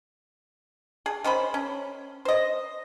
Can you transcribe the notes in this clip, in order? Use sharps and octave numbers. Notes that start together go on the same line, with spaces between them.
G#4
D#3 C#4 C5 B5
C#4
C5 D#5